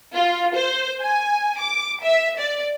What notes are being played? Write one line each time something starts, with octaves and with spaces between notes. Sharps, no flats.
F4
C5
G#5
D6
E5
D5